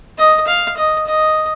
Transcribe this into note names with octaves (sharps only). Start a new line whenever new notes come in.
D#5
F5
D#5
D#5